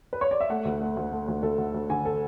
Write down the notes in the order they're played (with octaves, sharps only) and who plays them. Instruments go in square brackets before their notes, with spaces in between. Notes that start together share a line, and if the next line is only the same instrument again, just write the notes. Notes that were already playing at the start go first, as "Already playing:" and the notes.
[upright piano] B4
C#5
D5
E5
A3 F#5
D2
A3
D2
A3
D2
D2 A4
D2
D2
D3 G#5
A4